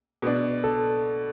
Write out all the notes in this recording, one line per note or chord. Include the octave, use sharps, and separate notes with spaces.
B2 B3 D4
A4